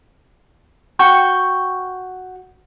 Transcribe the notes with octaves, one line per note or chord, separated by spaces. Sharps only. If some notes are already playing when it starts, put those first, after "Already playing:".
F#4 G5 C#6